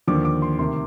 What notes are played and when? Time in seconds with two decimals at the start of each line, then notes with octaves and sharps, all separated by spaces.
0.07 D#2 D3 F3 D6
0.25 D6
0.42 C6
0.59 D2 C3 D#3 C6